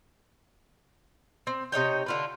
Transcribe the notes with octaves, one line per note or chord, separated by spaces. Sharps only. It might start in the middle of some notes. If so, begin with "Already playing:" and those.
C4
C3 D#4 C#5 G5
D3 F4 B4